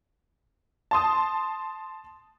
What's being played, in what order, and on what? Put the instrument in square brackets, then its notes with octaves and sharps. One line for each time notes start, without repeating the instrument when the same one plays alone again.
[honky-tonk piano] A5 C6 D#6